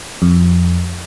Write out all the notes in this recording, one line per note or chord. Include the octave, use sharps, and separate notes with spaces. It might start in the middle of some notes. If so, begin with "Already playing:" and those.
F2